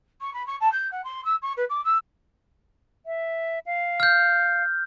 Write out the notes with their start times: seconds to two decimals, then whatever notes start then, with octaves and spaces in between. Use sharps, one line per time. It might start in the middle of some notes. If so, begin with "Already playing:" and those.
0.21 C#6
0.34 B5
0.47 C#6
0.60 A5
0.72 G6
0.91 F#5
1.04 C6
1.25 E6
1.42 C#6
1.57 B4
1.69 D6
1.84 E6
3.06 E5
3.66 F5
4.00 F6 G6